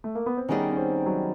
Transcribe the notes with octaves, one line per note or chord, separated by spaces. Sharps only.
A3
A#3
B3
C4
D#3 G3 B3 C#4 D#4 G#4
C#4
C4
F#3